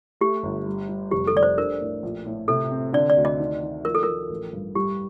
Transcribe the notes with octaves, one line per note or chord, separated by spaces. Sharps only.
A3 G4
G1
G3
G3
F1 G4
A4
F1 D5
C5
D4 A#4
A2
A#1
A2
C3 A4
C4
D3 D5
D5
D2
D#5
D#3
D#3
F3 A#4
A4
F3 A#4
A1
G2
G3 G4